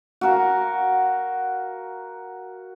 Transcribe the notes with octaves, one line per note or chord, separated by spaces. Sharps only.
F#4 A#4 F5